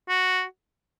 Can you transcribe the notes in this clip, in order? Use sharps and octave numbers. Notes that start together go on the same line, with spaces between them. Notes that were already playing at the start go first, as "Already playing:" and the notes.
F#4